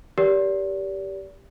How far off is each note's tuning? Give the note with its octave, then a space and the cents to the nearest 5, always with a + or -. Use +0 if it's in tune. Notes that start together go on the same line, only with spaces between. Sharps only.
G4 +0 A#4 +30 D5 -35